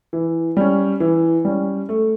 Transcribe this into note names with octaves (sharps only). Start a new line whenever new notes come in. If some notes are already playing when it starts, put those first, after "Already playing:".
E3
G3 C#4
E3
G3 C#4
A3